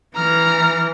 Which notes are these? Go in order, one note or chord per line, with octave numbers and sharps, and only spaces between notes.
E3 A#5 F6